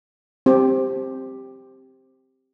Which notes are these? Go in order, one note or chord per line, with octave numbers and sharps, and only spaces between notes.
C4 G4